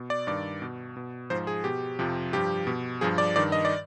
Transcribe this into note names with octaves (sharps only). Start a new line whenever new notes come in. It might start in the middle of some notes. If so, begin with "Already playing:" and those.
Already playing: B2
D5
G2 D#3 D5
B2
B2
G#2 F3 C5
G#4
B2 G4
F2 C3 F3
G2 F3 G4
B2
G2 F3 G#4
D5
G2 D#3 D5
D#5
D5